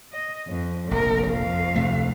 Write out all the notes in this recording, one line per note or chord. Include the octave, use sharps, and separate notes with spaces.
D#5
F2
F1 A#1 A#4
F2 F5
D2 C3 A3